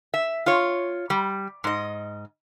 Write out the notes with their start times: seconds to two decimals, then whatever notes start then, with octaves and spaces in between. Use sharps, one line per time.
0.14 E5
0.46 F4 C#5
1.10 G3
1.64 G#2 D#5